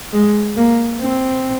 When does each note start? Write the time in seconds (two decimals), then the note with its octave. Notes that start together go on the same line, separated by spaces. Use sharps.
0.13 G#3
0.57 A#3
1.01 C4